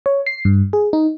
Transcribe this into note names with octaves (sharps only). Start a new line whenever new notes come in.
C#5
C7
G2
G#4
D#4